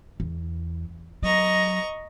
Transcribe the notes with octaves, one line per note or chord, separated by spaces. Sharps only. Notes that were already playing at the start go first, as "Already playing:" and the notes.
E2
F#3 D#5 A#5 C#6